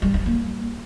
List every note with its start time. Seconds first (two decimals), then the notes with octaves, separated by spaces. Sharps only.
0.02 G3
0.14 D4
0.26 A#3